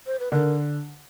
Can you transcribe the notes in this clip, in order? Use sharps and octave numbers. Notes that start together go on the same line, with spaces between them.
C5
B4
D3 A#4